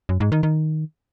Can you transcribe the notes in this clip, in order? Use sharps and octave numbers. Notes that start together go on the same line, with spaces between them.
F#2
G#2
D#3
D#3